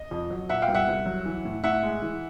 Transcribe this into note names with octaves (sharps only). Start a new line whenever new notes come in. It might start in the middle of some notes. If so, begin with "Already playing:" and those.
Already playing: D#5
F2
F#3
A#2 E5 F#5
F5 G5
C2
E5 F#5
C2
F#3
E3
A2
A2 E5 F#5
G#3
E3